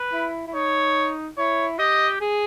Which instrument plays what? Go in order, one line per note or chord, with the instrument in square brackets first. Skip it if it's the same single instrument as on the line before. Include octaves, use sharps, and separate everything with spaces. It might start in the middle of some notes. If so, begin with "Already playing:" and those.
Already playing: [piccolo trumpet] B4
[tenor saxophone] E4
E4
[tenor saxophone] D#4 [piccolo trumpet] C#5
[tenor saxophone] E4 [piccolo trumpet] C#5
[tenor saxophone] G4 [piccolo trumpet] D#5
[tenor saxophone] G#4